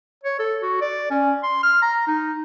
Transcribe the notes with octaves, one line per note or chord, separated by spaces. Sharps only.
C#5
A4
F#4
D5
C#4
C6
F6
A#5
D#4